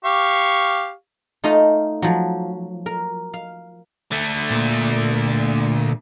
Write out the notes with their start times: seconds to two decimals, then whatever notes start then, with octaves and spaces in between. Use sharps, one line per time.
0.05 G4 F5 C#6
1.44 A3 D#4 F4 D#5 F5
2.02 F3 F#3
2.86 A#4
3.34 F5
4.12 D3 A3
4.51 A#2